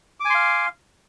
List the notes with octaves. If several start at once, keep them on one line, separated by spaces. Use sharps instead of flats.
F5 G#5 C6 D6